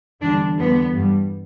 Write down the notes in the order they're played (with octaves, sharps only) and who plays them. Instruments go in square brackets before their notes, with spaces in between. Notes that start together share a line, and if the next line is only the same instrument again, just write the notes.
[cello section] E2 D3 G3 D4
E2 D3 G3 B3
G2 G3